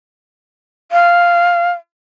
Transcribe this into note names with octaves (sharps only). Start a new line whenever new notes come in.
F5